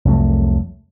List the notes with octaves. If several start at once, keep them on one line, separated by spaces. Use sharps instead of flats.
C2 F2 F#3 A3